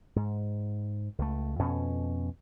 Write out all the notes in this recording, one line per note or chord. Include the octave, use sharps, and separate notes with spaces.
G#2
C#2 A3
F2 B2 C#4